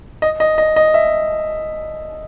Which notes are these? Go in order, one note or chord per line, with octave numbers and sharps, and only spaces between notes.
D#5
D#5
D#5
D#5
E5